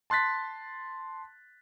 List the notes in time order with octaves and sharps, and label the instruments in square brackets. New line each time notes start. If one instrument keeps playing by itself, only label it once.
[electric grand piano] A5 C6 F#6 A6 B6